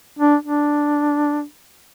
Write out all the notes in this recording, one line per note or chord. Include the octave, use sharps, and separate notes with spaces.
D4
D4